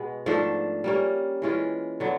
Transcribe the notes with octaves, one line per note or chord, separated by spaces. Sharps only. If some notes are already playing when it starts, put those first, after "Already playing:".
Already playing: B2 G#3 B3
G#2 F3 A3 D4
G3 A#3 C#4
E3 G#3 C#4 F4
D3 F#3 B3